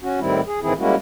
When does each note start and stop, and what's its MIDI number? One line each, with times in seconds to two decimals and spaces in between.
0.03 0.20 61
0.03 0.20 66
0.20 0.41 45
0.20 0.41 51
0.20 0.41 55
0.20 0.41 60
0.20 0.41 64
0.47 0.60 68
0.62 0.73 45
0.62 0.73 51
0.62 0.73 52
0.62 0.73 60
0.62 0.73 64
0.62 0.73 68
0.79 0.95 55
0.79 0.95 56
0.79 0.95 58
0.79 0.95 61
0.79 0.95 64
0.79 0.95 66